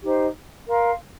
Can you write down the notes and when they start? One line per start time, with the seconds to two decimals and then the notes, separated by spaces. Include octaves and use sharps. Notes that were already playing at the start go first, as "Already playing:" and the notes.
0.02 D#4 G4 C5
0.68 A#4 F5 C6